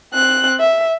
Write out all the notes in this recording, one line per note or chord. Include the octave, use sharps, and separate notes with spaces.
C4 F#6
E5